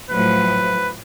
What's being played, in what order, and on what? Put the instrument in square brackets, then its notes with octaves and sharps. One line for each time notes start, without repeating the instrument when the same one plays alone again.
[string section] A2 F3 F#3 [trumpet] B4